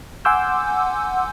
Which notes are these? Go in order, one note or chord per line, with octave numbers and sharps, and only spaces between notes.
F#5 G#5 C6 D6 E6 G6